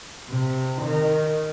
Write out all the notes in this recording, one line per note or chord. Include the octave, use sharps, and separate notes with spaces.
C3
D#3